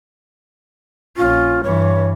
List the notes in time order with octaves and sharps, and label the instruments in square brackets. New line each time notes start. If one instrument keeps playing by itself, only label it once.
[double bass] A#1 C#4 [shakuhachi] F4
[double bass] G2 E3 [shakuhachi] C#5